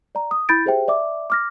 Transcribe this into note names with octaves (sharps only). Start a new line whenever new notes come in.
D5 A#5
D#6
E4 B5 G6 A6 D7
G4 G#4 C5 E5 G5
D5 E5 D6
D6 F6 A#6